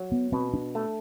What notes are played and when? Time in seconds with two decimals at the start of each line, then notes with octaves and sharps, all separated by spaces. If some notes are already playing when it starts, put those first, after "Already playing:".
Already playing: F#3
0.12 B3
0.32 B2 C4
0.54 D4
0.75 A3